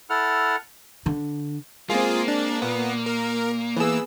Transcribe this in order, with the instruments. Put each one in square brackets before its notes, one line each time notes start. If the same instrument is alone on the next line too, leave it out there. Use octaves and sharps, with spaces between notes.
[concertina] E4 A4 F#5 F6
[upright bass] D3
[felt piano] G#3 C4 [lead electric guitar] A#3 [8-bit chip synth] F4 G#4
[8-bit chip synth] D4
[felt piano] A#2 [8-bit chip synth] B3
[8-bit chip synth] A#4
[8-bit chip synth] E3 E6 [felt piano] B3 G#4